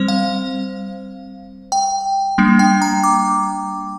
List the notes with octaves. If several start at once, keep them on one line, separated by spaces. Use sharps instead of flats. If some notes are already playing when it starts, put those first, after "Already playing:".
Already playing: G3 C4 C5
F5
G5
G3 A#3 D4
G5
A#5
D6